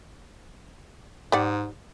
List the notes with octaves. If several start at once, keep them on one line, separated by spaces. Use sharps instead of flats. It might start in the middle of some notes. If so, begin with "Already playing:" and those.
G#2 G3 D5 F#5